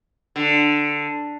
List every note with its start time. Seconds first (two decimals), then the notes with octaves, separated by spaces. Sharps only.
0.36 D3